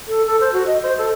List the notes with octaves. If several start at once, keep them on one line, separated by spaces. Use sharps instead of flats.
A4
A4
C5
F#4
D#5
C5
A4